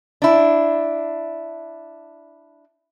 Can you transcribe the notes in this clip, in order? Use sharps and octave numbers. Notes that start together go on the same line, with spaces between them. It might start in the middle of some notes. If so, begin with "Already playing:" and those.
D4 E4